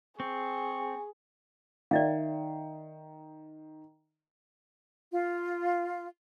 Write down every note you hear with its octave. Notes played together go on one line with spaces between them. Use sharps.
C4 G#4 C#6
D#3 D5 E5 F5
F4